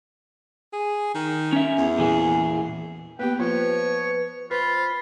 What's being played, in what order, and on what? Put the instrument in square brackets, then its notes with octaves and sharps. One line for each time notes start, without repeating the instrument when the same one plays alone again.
[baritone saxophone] G#4
D#3
[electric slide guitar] C#4 E5
[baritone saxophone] E2
[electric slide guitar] A#2 E3 G#4
[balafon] A#3 B3 G4 [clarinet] B4 [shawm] G5
[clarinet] F3 [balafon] A#3 F4 [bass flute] B4 [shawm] C#5
[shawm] F4 [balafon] B4 [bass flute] C5 [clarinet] B5